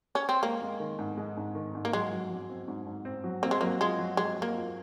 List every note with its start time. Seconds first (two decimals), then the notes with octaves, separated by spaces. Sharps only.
0.15 C#4
0.29 C4
0.43 G#3 A#3
0.62 G#3
0.80 D#3
0.99 G#2
1.17 G#3
1.37 G#2
1.55 D#3
1.75 G#2
1.85 A#3
1.93 F#3 G#3
2.12 F#3
2.30 F#3
2.49 C4
2.68 G#2
2.87 G#2
3.05 C4
3.24 F#3
3.43 A#3 C4
3.51 G#3
3.61 F#3 A#3
3.81 G#3 F4
3.99 F#3
4.17 F#3 G#3
4.37 F#3
4.42 A#3
4.55 F4